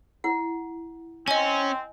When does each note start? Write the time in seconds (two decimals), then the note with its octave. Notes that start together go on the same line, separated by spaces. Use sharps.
0.24 E4 F#5
1.28 C4 C#4 D#5 G#5